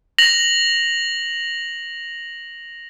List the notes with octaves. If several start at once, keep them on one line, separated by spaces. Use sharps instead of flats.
A#6 F7 F#7